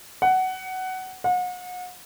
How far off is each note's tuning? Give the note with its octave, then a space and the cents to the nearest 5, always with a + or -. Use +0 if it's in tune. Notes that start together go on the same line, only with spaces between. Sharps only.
F#5 +15
F#5 -35